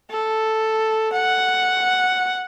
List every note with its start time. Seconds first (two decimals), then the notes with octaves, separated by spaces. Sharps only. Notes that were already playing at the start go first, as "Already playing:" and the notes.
0.11 A4
1.13 F#5